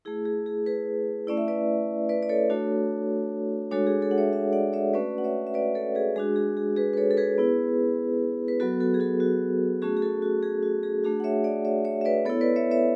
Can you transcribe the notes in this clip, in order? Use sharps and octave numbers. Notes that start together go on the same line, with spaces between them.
A3 E4 G#4
G#4
G#4
G#4 B4
A3 C#4 E4 D5
E5
B4 D5
B4 D5
D5
A4 C#5
A3 D4 F#4
G#3 D4 F#4 A4 C#5
G#4
A4 C#5
F#5
C#5 E5
C#5 E5
D5 F#5
C#5 E5
A3 C#4 F#4 B4 D5
F#5
C#5 E5
E5
B4 D5
A4 C#5
G#4 B4
G#3 D4 F#4 G#4
G#4
G#4
G#4 B4
B4
A4 C#5
A4
G#4 B4
B3 E4
B4
F#3 B3 F#4 A4
F#4 A4
G#4
F#4 A4
F#4
A3 C#4 F#4 G#4
G#4
F#4 A4
F#4
G#4
F#4
G#4
A3 D4 F#4 G#4
F#5
C#5 E5
D5 F#5
C#5 E5
C#5 E5
E5
B4 D5
B3 E4 A4 C#5
B4 D5
C#5 E5
C#5 E5